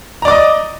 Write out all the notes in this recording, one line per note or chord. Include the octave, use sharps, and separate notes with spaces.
D5 D#5 A#5 D6